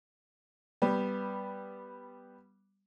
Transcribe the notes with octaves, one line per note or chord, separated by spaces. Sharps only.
G3 B3